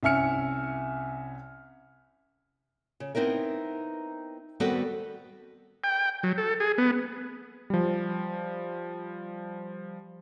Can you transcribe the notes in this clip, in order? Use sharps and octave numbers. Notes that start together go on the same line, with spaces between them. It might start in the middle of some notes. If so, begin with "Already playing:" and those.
C2 C#4 E5 G#5 F6 C#7
C#3
B3 C4 D#4 E4 A#4
D#3 G3 B3 C4 F#4 A4
G5
F#3
A4
G#4
B3
F3 G3